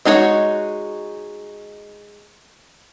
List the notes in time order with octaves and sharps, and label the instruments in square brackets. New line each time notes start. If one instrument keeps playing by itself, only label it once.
[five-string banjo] G#3 D#4 F#4 G#4 C#5